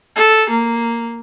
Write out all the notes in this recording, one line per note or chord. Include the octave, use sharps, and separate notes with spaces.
A4
A#3